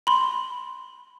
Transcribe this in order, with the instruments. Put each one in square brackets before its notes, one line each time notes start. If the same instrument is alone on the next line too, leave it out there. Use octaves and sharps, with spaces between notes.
[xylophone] B5 C6